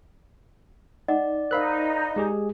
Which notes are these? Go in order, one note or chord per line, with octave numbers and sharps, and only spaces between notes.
D#4 D5 D#5 F#5
D#4 A#4 C5 F5 B5 F#6
G#3 G4 G#4